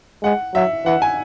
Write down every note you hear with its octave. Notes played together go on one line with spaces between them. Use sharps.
G#3 F#5
F#3 E5
E3 F#5
G#5